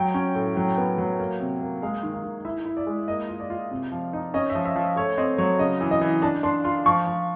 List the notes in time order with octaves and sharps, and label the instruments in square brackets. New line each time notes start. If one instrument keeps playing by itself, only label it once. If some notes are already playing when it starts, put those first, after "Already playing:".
Already playing: [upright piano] F#3 G5
C#4
A2
F#3
B3
F#3
A#3
C3
A#3
G#3 F5
D#3
F5
D#3
E4 E5
E4
D5
G#3
A#3 D#5
F4
D5
F4
C3
F3
D#4
C#4 D#5
E5
F3
E5
F3
A3 C#5
C4 D#5
F#3 C#5
C#3 D#5
E3
D#5
E3
D4 A5
D4 C6
F4 C6
F3 C#6
F3